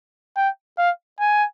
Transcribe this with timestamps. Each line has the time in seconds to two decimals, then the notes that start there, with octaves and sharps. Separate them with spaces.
0.37 G5
0.78 F5
1.20 G#5